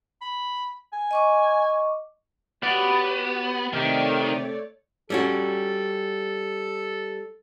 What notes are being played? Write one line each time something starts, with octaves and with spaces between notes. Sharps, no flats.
B5
G#5
D#5 C#6 D6
B3 F#4 G4 C#5 D5
C3 D#3 A3 G4 C#5 D5
G3 C#4 F#4 A4